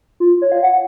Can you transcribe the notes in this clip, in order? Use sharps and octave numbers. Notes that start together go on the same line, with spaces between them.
F4
C#5
F5
F#5